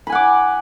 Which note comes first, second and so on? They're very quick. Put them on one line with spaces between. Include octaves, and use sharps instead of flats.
B5 G#5 F#5 D6